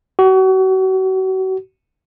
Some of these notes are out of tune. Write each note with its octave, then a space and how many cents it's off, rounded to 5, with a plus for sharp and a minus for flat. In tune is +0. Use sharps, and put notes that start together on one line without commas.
F#4 +35